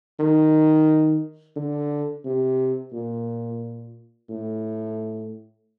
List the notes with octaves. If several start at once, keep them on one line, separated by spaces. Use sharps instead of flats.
D#3
D3
C3
A#2
A2